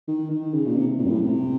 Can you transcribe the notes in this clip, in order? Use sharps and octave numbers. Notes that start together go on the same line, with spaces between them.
D#3
D#3
C#3
A#2
C3
A#2
F#2
A2
C3